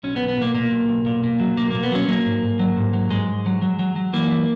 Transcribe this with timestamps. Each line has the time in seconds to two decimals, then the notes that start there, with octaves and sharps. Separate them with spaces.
0.03 B1 C#4
0.16 B3
0.21 B1
0.28 B3
0.37 A#2 A#3
0.54 A#2 A#3
0.71 B1
0.88 B1
1.06 A#2
1.24 A#2
1.40 F#3
1.57 B1 A#3
1.71 A#2 A#3
1.83 B3
1.92 F#3 C#4
2.08 F#3 A#3
2.25 G#2
2.43 G#2
2.59 F#3
2.77 G#2
2.93 F#3
3.11 G#2 G#3
3.28 G#2
3.46 F#3
3.62 F#3
3.79 F#3
3.96 F#3
4.13 E3 A#3
4.30 E3